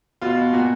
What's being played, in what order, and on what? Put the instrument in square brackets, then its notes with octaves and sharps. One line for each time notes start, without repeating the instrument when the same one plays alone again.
[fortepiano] B2 F4
B2
A#2 F#4